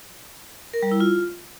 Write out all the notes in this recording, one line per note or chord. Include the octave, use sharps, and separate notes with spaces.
A#4
G3
E4
F4